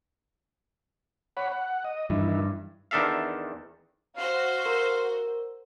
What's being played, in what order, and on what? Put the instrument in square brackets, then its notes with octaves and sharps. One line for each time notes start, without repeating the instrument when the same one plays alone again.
[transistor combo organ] C#5 F#5 B5
F#5
D#5
[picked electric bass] G2 [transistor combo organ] D#3 E3 E4
[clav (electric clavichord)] E2 D#3 D4 A4 E5 F5
[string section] F#4 C5 [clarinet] F5
[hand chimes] A#4